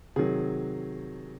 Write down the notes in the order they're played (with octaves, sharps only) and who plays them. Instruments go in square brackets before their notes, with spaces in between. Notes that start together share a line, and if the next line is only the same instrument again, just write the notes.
[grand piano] C3 D#3 F#3 G#4